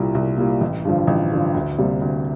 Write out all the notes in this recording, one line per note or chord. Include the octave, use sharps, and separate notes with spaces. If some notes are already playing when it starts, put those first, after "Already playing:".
Already playing: C2 A#2 G3 A#3 E4
C2
A#2 G3 A#3 E4
A1
G2 D3 F3
A1
G2 D3 F3
D2
C3 G3 A#3
D2